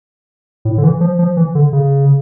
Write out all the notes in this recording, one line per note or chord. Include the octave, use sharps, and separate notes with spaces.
A2
D3
E3
F3
F3
E3
D3
C#3